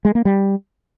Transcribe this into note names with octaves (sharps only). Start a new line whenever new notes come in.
G#3
A#3
G3